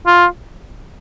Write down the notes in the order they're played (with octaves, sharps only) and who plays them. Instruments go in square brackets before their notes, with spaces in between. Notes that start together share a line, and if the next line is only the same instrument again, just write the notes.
[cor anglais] F4